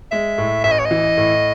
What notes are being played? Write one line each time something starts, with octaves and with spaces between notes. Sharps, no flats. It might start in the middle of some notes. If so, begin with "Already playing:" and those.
G#3 E5
A2
A1 E5
D#5
C#5
D#5
E3
A2